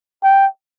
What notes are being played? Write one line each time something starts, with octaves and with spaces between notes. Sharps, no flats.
G5